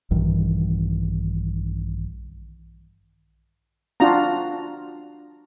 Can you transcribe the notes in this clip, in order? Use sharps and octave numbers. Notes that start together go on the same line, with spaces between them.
A#1 G2 D#3 E3
D4 F4 F#4 A#5